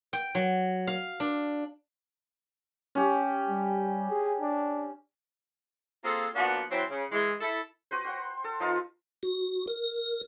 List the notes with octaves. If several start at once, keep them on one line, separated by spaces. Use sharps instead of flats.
G5
F#3
F5
D4
C#4 G4
G3
G#4
D4
A#3 C4 F4 G#4 A4
F3 A#3 B3 D4 F#4
E3 F#3 C4
C#3
E3 G#3
E4 A4
F#4 B4 C5
C5 F#5 G5
A4
F3 D#4 F4 B4
F#4
A#4